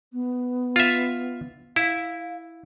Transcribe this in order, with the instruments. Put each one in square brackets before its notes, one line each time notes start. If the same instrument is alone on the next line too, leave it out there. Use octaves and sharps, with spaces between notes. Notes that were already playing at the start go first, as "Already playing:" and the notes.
[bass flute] B3
[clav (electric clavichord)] F4 E5
[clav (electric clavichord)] E4 [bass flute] F5